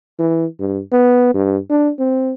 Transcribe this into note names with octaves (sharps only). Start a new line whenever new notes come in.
E3
G2
B3
G2
D4
C4